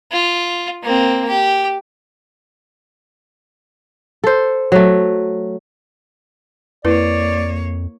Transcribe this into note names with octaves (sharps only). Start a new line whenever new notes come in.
F4
A#3 C4
G4
A4 C5
F#3 A3
F2 A#3 E4 B4 C#5 D5